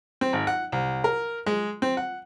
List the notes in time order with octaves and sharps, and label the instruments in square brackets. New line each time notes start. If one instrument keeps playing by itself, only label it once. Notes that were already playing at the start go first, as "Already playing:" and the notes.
[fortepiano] C4
G#1
F#5
C2
A#4
G#3
C4
F#5